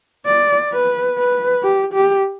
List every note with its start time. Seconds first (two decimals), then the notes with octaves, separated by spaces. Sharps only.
0.26 D5
0.72 B4
1.18 B4
1.63 G4
1.94 G4